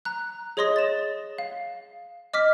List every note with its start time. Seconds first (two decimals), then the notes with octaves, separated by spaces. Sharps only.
0.05 A#5 F#6
0.57 G#4 C#5 D#5 C6 D#6 A#6
0.76 A6 E7
1.38 F5
2.34 D#5 D6 F6 B6